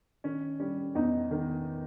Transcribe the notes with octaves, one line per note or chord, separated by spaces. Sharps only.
D#3 C#4
G3 C#4
E2 D#4
D#3